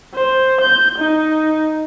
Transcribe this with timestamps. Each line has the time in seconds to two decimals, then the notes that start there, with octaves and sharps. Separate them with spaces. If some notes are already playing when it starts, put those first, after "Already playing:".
0.15 C5
0.62 G6
0.99 D#4